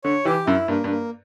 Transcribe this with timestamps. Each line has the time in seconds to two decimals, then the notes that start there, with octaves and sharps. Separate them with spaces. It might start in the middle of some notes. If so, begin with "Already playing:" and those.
0.04 D3 C#5
0.25 E3 G4
0.46 F#2 E4
0.68 G2 A#3
0.84 G2
0.89 A#3